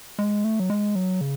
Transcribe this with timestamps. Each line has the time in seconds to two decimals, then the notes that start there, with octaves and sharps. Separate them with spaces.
0.19 G#3
0.44 A3
0.60 F#3
0.70 G#3
0.95 F#3
1.21 C#3